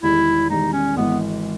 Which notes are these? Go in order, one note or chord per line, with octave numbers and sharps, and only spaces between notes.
E1 E2 D#3 G3 E4
E1 E2 D#3 G3 D#4
C#4
G#1 G#2 E3 B3